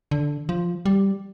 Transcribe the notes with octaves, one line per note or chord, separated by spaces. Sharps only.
D3
F3
G3